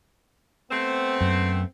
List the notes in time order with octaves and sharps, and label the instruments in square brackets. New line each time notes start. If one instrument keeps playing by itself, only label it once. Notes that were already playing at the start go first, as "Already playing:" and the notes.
[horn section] A3 B3 C4
[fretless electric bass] F#2